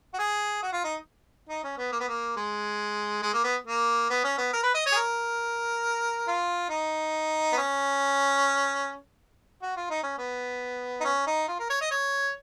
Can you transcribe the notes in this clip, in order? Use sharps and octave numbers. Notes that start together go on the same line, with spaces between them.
F#4
G#4
F#4
F4
D#4
D#4
C#4
B3
A#3
B3
A#3
G#3
G#3
A#3
B3
A#3
B3
C#4
B3
A#4
B4
D#5
C#5
G#4
A#4
F4
D#4
B3
C#4
F#4
F4
D#4
C#4
B3
D#4
C#4
D#4
F4
A#4
C#5
D#5
C#5